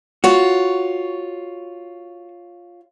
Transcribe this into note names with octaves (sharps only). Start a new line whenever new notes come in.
F4 F#4 C#5